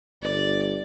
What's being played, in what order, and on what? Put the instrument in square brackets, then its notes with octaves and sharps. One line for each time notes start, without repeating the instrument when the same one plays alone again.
[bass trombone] G1 [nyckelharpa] D5